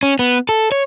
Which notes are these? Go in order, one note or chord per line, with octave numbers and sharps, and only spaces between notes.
C#4
B3
A4
C#5